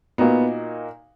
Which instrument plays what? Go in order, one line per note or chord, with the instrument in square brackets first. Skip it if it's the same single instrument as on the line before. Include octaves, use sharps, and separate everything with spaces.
[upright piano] A#2 A#3 D#4 F#4 [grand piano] B3